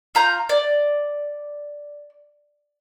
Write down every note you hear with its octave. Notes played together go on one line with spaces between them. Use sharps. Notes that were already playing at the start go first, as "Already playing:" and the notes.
F4 A#5 G6
D5